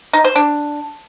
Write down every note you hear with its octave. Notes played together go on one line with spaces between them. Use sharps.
D#4
C5
D4